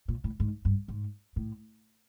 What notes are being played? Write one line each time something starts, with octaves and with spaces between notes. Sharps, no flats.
A#2
A2
G#2
G2
G#2
A2